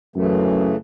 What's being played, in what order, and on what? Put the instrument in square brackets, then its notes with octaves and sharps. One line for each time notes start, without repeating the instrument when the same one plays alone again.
[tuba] F#2 [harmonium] C#3 E3 A3